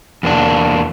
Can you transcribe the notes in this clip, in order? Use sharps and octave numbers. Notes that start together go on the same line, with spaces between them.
E2 A#3 D4